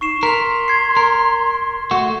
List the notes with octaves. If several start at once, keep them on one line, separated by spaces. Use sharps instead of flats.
D#4 C#6 C7 E7
A#4 C6 B6 F7
G#6 C7
A#4
A3 F#4